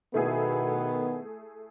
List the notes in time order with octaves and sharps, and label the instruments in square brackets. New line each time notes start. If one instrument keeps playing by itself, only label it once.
[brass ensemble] B2 D#3 B3 [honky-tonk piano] A3 E4 G#4